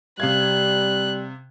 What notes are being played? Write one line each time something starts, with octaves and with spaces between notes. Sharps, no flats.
C3 G3 F5 F#6 G#6